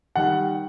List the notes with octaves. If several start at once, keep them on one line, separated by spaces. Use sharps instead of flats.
D#3 G3 F#5